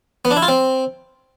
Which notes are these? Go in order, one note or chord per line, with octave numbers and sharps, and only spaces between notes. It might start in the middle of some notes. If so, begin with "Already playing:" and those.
B3
D4
E4
F4
C4